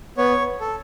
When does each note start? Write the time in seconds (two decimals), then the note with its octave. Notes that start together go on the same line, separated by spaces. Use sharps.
0.18 B3 C#5
0.60 A4